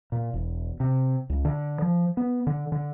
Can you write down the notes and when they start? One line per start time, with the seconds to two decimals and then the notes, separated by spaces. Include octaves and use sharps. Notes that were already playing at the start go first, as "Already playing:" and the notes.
0.12 A#2
0.34 E1
0.80 C3
1.30 C#2
1.45 D3
1.82 F3
2.17 B3
2.47 D3
2.72 D3